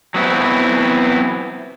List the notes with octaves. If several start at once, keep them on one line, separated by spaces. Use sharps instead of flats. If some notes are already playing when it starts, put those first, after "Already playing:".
F#3 B3 C4 E4